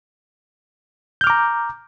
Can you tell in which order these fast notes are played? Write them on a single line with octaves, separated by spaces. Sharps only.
G6 F6 D6 A#5